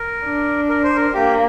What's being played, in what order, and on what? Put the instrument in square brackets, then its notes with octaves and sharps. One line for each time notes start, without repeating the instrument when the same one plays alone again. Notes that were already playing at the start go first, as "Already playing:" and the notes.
Already playing: [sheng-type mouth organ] A#4
[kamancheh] D4
[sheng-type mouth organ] A#4
C5
A#4
[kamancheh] A#3 [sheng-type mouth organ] G4